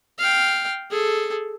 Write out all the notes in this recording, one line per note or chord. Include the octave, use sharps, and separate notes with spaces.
F5 G5
G#4 A4